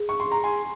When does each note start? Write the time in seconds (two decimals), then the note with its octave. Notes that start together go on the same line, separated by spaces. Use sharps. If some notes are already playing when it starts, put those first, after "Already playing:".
Already playing: G#4
0.09 C#6
0.20 C6
0.32 A#5
0.44 G#5 C6